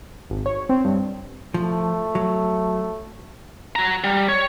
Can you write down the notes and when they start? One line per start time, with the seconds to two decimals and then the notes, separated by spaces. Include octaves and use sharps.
0.30 G#1
0.46 C#5
0.69 C4
0.85 G2
1.54 F3 A3
2.15 F#3
3.76 F#4 A#5
4.04 G3
4.29 C#5